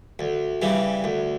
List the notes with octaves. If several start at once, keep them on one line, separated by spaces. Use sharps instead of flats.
D2
C#3 E3 G3
D2